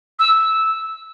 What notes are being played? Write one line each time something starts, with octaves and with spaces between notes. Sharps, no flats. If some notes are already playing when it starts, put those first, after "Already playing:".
E6